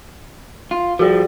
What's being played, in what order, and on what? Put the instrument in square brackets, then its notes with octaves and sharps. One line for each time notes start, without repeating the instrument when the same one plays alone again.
[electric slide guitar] F4
[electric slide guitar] F3 G3 [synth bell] F#4 G#4 D5